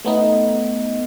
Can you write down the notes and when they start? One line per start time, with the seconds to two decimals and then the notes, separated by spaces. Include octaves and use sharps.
0.05 A3 B3 D#4